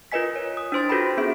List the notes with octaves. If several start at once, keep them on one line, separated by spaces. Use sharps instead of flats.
F4 A#4 B4 D#5 G#5 B6
C#5
D#6
D4 E4 C5 C6 A6
F4 F#4 A4 B4 G5 B5
B3 C#4 D4 G#4 E5 D7